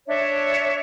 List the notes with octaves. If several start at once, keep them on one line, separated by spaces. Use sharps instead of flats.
D4 C#5 E5